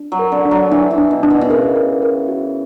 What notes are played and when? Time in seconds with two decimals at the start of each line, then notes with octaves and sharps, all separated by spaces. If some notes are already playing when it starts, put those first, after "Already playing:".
Already playing: D4
0.12 F#3
0.19 A#4
0.32 D3
0.45 D4
0.51 F#3
0.71 E3 D4
0.91 E3
0.98 D4
1.11 B2
1.23 D4
1.30 B2
1.41 B2
1.50 C#3 A#4
1.76 A#4
2.02 A#4
2.28 F#4